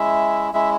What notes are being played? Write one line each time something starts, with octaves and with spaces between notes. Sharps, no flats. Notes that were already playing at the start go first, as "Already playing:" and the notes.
Already playing: G#3 C#4 E4 E5
G#3 C#4 E4 E5